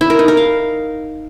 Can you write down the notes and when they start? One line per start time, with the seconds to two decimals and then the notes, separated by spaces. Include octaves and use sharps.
0.01 E4
0.10 A#4
0.19 D#4
0.28 A#4
0.37 F5